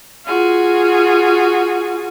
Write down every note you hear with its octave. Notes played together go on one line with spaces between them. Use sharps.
F4 F#4 G#4